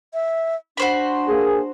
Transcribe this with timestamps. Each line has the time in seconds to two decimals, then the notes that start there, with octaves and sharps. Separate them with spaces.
0.14 E5
0.77 D4 F#4 C5 B5
1.28 A#3 G#4